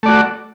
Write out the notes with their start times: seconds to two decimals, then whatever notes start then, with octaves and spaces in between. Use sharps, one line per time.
0.03 A3
0.06 D5
0.08 F#4